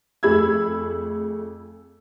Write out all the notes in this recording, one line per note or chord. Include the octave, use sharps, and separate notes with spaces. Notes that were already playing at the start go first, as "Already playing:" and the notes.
F2 A3 G#4 B5 E6 G#6